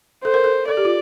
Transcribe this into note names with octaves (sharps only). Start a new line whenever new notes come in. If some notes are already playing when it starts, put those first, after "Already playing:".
A4 C5
A#4
A4
A4 D5
G4
F4